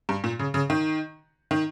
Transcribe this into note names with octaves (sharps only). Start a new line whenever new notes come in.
G2
A#2
C#3
C#3
D#3
D#3